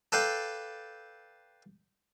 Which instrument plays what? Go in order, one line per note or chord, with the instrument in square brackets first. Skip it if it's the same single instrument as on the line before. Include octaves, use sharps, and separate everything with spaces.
[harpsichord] A4 B4 D5 F5 G5